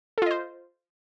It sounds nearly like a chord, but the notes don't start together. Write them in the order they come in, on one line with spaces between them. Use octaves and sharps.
A4 F4 D#5 C5